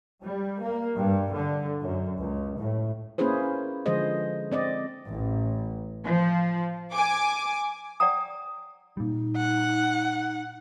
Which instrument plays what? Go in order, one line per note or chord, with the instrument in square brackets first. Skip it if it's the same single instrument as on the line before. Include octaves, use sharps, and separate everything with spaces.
[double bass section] G3
A#3
G2
D3
F#2
C#2
A2
[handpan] A#3 C#4 E4 G#4 B4 C5
D3 F3 G#3 G#4 C5 D#5
C4 D5 D#5
[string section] A1
F3
G#5 D6
[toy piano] D5 F#5 G5 A#5 D#6
[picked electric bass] A#2 G3 [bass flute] D#4
[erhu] F#5